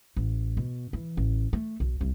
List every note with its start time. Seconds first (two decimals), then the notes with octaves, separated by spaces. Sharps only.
0.17 A1
0.57 B2
0.93 E3
1.17 A1
1.53 A3
1.80 B1
2.01 C2